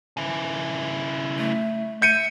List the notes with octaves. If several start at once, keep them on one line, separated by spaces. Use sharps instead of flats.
C#3 E4
A3
E5 G6 C#7 D#7